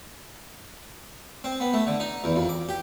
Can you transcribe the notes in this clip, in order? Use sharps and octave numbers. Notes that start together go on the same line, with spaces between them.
C4
B3
A3
D3
D#4
E2
F2
D6
G4